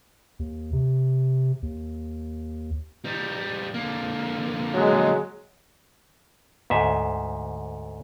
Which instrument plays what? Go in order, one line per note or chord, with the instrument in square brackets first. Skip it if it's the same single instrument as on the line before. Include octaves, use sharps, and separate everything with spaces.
[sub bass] D#2
C3
D#2
[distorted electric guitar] G3 D#4
D3 A#3
[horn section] F#3 G#3
[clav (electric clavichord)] D2 G#2 E5